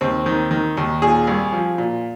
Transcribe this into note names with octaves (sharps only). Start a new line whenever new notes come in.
D#2 C4
D#3
D#3
D#2
A#2 G#4
C2
F3
A#2